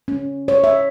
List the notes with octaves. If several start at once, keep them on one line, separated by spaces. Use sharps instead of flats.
C#4
C#5
E5